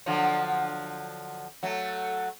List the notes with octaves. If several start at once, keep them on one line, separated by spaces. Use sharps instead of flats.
D3 F3 F#3
F#3 A3